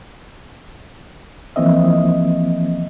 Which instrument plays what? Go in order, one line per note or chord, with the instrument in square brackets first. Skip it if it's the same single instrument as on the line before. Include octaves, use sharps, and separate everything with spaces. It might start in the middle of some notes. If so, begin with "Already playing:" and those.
[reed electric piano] E3 F3 A#3 C4 D#5 E5